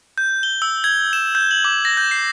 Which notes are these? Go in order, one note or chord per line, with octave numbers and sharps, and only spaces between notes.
G6
G7
E6
G#6
E7
G6
F#7
D6
A#6
G6
C7